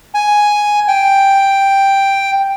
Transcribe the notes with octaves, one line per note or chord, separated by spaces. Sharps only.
G#5
G5